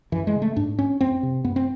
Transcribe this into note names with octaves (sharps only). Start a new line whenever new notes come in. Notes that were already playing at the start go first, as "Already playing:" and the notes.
F#2 E3
G#3
C#3
A3
G#2 D4
C#4
F2 C4
C3
F#2 B3
C4